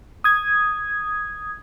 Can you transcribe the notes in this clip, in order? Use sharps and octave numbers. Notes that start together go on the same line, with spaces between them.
D#6 G#6